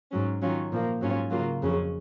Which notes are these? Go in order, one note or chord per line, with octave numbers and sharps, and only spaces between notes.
G#2 F#3 C#4
D#3 F#3 C#4 F4
A#2 F3 A#3
G#2 F#3 C#4 F4
C#3 F#3 A#3 F4
F2 C#3 F#3 C#4